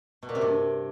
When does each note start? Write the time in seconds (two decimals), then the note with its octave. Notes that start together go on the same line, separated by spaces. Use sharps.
0.23 B2
0.29 A#2
0.35 C3
0.41 G2